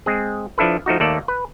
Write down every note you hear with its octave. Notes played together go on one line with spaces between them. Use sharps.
G#3 C4 G#4
F3 D4 E4 A4 B4
F3 A3 D#4 F#4
D#2 A3 A#3 A4 D5
B4